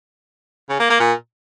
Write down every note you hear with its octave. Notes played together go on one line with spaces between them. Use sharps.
C#3
A#3
A#3
A#2